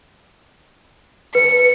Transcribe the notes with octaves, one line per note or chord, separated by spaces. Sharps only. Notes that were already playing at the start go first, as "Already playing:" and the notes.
B4 C#7